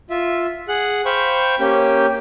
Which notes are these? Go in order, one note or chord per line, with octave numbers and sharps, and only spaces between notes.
F4 E5
G#4 F#5 F#6
C5 F5 G5 B5 C#6
A#3 C#4 G4 G5